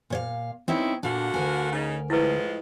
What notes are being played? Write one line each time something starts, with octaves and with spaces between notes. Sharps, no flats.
A#2 C#5 F5
G2 E3 C4 D#4 E4 C#5
A#2 D3 D4 F4 F#4
D2 A#4 G#5
C#3 D#4
A2 F3 G#3 E4 B4